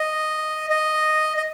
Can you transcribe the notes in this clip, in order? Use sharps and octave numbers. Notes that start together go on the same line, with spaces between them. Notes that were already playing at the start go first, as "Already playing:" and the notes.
Already playing: D#5
D#5
D#5